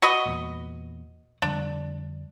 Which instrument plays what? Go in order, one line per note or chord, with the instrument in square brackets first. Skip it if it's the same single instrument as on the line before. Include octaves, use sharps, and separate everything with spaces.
[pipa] F#4 B4 D#5
[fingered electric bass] E2 A#2
[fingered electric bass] F2 D3 G3 [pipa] D4